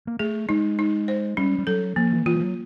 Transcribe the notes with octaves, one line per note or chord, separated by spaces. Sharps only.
A#3
A3 G#4
G#3 D#4
D#4
C5
G3 C#4
G3
F#3 A4
F3 A#3
E3
E3 F4
G3
F#3